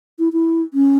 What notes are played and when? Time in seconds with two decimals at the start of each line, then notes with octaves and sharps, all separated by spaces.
0.19 E4
0.33 E4
0.74 C#4